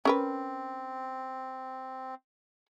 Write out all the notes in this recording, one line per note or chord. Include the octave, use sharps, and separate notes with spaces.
C4 C#4 A#4 B4